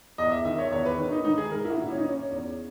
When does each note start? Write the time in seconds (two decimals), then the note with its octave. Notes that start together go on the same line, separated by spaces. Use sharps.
0.18 E2 D#5
0.32 E5
0.45 D#3 E5
0.58 C#5
0.71 E2 C#5
0.85 B4
0.99 D#3
1.12 D#4
1.25 G#2 D#4
1.38 G#4
1.51 D#3 A#4
1.65 E4
1.70 F#4
1.78 A#2 E4
1.91 C#4
1.97 D#4
2.04 C#4
2.17 C#4
2.31 E2